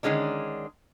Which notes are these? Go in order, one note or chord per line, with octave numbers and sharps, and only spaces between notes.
D3 D#3 G#3 C#4 D4